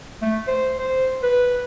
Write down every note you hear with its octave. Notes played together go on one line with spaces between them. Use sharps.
A3
C5
C5
B4